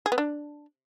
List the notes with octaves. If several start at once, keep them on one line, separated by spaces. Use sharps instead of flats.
G#4
B3
D4